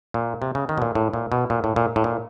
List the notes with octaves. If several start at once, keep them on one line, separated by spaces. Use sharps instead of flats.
A#2
C3
C#3
D#3
B2
A#2
A2
A#2
B2
A#2
A2
A#2
A2
A#2